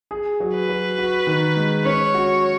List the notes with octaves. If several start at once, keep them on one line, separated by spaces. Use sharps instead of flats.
G#4
F#3
B4
F#3
F#4
D#3
G#3
C#4 C#5
F#4